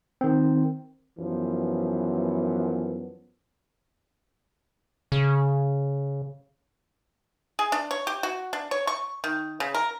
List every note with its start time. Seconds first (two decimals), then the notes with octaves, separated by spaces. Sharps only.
0.21 D#3 C4
1.19 F#2 E3 F3 B3
5.12 C#3
7.59 G#4
7.72 D4
7.91 C#5
8.07 G4
8.23 F#4
8.53 D4
8.71 C#5
8.87 C#6
9.24 D#3
9.60 C#3
9.75 A#4